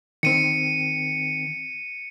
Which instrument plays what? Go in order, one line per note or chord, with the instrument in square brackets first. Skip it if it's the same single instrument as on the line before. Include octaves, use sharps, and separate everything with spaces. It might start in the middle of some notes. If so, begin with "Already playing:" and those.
[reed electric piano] D#3 C4 [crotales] C#7 D#7